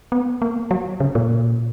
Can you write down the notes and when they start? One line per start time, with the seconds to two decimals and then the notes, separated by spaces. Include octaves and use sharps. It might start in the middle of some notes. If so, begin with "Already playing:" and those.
0.12 B3
0.42 A#3
0.71 F#3
1.00 C#3
1.15 A#2